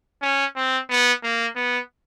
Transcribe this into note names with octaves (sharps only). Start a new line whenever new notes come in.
C#4
C4
B3
A#3
B3